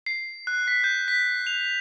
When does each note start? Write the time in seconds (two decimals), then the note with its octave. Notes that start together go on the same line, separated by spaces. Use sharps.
0.06 C7
0.47 F#6
0.68 B6
0.84 G6
1.08 B6
1.47 F7